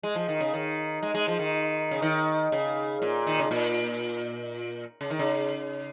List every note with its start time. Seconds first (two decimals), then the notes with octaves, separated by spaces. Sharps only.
0.03 G#3
0.15 F3
0.29 D#3
0.41 C#3
0.53 D#3
1.03 G#3
1.14 G#3
1.28 F3
1.39 D#3
1.91 C#3
2.02 D#3
2.52 C#3
3.02 A#2
3.27 D#3
3.40 C#3
3.51 A#2
5.01 C#3
5.10 D#3
5.19 C#3